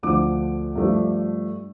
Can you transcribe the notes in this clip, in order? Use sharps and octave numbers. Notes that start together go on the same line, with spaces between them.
D2 D3 F3 D6
G2 F3 A3